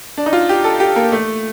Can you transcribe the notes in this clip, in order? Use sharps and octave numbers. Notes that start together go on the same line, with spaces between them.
D4
D#4
F4
G4
A4
G4
A#3
A3